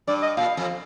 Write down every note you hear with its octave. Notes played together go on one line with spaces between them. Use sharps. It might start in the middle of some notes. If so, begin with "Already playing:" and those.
G2 D5
D#5
A#2 F5
F2